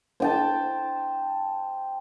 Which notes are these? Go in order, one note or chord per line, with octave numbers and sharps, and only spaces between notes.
C5 G5 A5